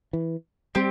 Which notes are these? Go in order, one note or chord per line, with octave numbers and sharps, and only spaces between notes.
E3
G3 C4 G4